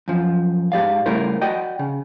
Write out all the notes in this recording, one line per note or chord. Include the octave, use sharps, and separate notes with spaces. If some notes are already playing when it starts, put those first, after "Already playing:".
F#2 F3
G#2 G4 D5 F5
C#3 G3 A3 E4 A#4 C5
F#4 D5 D#5 G5
C#3